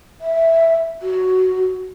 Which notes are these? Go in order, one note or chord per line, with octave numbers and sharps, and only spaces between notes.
E5
F#4